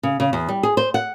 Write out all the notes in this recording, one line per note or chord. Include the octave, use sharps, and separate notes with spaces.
C#3
C#3
E2
G3
G#4
C5
F#5